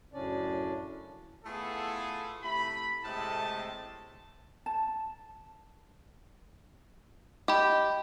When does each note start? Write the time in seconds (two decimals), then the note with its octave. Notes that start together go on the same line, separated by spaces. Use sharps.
0.13 F#2 A2 C#3 C#4 D4 D5
1.45 A3 B3 E4 F4 G#4 A4
2.42 C3 A3 E4 B5
3.04 A2 C3 G#3 A3 D#5 A5
4.66 A5
7.48 G4 D#5 B5